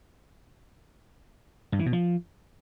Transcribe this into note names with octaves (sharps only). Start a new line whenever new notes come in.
G2
E3
B2
F3